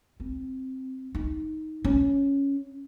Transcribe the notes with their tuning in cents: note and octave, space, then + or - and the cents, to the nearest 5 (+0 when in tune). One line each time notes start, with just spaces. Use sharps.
C4 +0
D#4 +10
C#4 +0